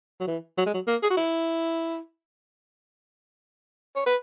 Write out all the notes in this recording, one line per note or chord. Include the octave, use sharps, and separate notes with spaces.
F#3
E3
F#3
G#3
F#3
A#3
G#4
F#4
E4
C#5
B4